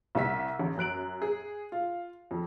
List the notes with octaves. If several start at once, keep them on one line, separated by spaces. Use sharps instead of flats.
C2 G3 E5 B6
A1
F#2 F#6 D7 F#7
G#4
F4
F2